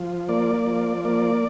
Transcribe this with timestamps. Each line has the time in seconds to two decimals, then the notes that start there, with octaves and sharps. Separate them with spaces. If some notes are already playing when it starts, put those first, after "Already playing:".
Already playing: F3
0.29 A#3 D5
0.67 F3
1.05 A#3 D5